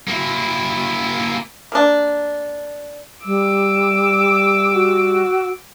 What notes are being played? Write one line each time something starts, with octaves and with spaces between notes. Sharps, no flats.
A#3 E4
A#3 D4
G3 D6 E6
F#4